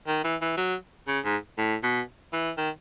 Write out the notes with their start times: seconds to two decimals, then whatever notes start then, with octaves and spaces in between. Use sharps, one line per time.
0.07 D#3
0.24 E3
0.41 E3
0.57 F#3
1.07 C#3
1.25 G#2
1.58 A2
1.83 B2
2.33 E3
2.58 D#3